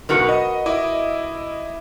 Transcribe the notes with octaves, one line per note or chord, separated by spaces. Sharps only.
B1 F#4 A#4 B4
D#5
E4 D#5 D6